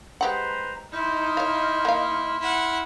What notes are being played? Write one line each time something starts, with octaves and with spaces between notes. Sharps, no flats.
G#3 G4 B4 C5 F#5 A#5
D#4 E4 C6 F6
C#5 F5
A#3 F5
E4 F#5